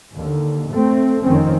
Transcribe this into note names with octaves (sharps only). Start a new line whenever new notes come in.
D#2 D3
A3 C4
F1 F2 D#3 C4 C#4